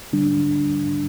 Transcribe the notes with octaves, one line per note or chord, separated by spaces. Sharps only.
D3 G3 D4